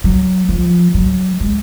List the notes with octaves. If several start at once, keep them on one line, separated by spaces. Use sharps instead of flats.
F#3
F3
F#3
G#3